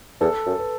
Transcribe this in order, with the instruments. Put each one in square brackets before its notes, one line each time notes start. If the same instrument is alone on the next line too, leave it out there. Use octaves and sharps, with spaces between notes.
[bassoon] E2 [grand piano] A4
[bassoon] F#2
[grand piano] B4